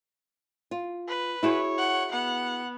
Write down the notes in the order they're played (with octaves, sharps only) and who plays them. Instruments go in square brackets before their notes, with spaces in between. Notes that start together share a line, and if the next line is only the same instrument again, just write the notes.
[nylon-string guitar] F4
[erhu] B4
[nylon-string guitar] E4 F#4 G#4 [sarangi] C#5
[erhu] F#5
[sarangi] B3 [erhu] F#5